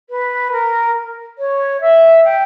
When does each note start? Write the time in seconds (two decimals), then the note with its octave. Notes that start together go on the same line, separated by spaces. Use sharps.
0.09 B4
0.51 A#4
1.38 C#5
1.81 E5
2.24 G5